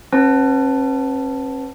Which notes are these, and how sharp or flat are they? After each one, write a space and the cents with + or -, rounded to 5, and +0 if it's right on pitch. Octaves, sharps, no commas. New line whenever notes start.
C#4 -45 B4 +0 A5 +0